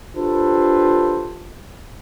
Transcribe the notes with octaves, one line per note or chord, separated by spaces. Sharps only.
D4 F4 G4 A4 B4 C5